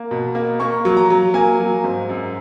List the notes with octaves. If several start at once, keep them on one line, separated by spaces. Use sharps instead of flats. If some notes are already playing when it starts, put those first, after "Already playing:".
Already playing: A#3
B2
A#3
A#3 C#6
F#3
A#5
F#3
A#3 G#5
F#3
G#2
F#2